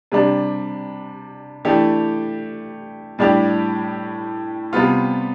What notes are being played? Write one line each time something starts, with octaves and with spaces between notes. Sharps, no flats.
C3 G3 D4
E3 A3 D4 G4
A2 G3 D4 G4
C3 G3 B3 F4